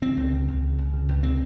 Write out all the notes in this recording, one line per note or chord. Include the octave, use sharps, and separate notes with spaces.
C#3 C4
C#2
C#3
C#2
C#3
C#2
C#3
C#2
C3 C4